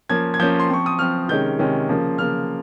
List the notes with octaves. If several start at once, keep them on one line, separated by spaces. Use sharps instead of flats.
F3 A#3 C#4 G#6
G#6
F3 A#3 C#4 G6
C6
F3 C4 C#6
D#6
F3 C4 F6
C3 D#3 G#3 C#4 G6
C3 D#3 G#3 C#4
C#3 F3 A#3
C#3 F3 A#3 F6